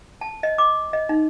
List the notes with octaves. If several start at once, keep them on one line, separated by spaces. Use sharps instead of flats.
A5
D#5
D6
D#5
D#4